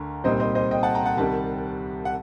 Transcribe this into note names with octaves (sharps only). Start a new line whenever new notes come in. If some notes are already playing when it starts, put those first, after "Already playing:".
Already playing: D2 D3 A3 A#4
C2 A#2 G3 C4 D#4 C5 D#5
C5 D#5
C5 D#5
D#5 G5
F#5 A5
G5 A#5
F#5 A5
C2 C3 D#3 G3 F#5 A5
F#5